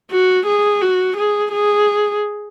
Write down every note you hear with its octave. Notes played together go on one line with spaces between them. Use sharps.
F#4
G#4
F#4
G#4
G#4